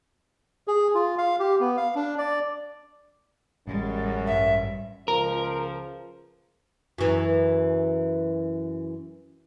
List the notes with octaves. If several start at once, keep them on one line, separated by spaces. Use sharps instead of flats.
G#4
F4
F5
G4
B3
F5
D4
D5
A1 F#2 G3 G#3
G2 E5
C#2 F3 A#4
F#2 E3